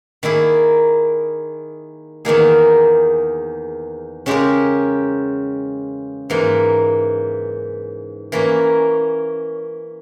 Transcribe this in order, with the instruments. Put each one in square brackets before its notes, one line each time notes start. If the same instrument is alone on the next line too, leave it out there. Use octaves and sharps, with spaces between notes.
[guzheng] D#3 A#3 E4 G#4
E2 D#3 A#3 D#4 G#4
C#3 G#3 C#4 G4 A#4
G#2 E3 A#3
E3 A#3 C#4